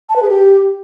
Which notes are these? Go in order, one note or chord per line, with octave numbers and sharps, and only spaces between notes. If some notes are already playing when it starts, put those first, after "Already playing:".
A5
B4
G#4
G4